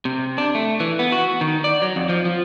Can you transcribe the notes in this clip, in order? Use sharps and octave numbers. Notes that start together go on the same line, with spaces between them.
C3
D4
A3
E3
B3
F#4
D#3
D5
F#3
F2
F3
F3